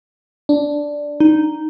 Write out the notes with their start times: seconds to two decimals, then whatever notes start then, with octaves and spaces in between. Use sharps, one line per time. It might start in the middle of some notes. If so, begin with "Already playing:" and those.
0.49 D4
1.20 D#4